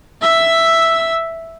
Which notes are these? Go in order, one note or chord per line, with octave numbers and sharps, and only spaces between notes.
E5 E6